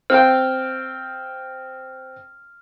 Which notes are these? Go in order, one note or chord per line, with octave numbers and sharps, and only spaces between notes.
C4 F5 G5 F6